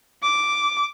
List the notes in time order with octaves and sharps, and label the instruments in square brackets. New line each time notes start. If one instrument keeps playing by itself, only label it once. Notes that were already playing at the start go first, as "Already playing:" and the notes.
[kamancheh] D6